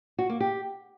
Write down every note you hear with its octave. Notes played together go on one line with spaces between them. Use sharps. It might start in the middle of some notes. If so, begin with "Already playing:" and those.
F#4
A#3
G4